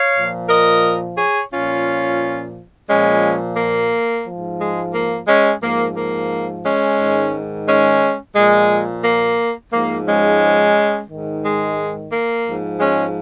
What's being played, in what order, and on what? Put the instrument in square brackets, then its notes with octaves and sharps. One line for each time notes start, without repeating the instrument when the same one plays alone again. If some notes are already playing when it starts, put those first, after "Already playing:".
Already playing: [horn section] C#5 F5
A#2 F3
A#4 D#5
G#4 C#5
A#2 F3 C#4 F4
A#2 F3 G#3 C#4
A#3
G#2 F3
G#3
A#3
G#3 C#4
G#2 F3 A#3
A#3
G#3 C#4
G#2 D#3
G#3 C#4
A#2 F3 G#3
A#3
G#2 F3 A#3
G#3 C#4
G#2 D#3
G#3
A#3
G#2 F3
G#3 C#4